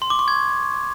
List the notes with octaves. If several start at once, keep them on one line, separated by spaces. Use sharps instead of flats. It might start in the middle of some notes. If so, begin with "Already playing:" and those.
C6
D6
C#6
G#6